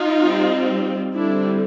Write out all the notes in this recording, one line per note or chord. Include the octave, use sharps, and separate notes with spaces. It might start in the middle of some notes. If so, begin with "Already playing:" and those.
Already playing: D#4 F4
G3 C4
D3 G3 C4 D4 E4